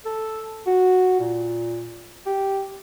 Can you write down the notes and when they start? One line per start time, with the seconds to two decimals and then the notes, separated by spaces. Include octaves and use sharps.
0.05 A4
0.66 F#4
1.20 A#2
2.26 G4